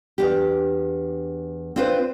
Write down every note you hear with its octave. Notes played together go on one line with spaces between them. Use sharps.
E2 D4 G4
C4 D4 F4 B4 C5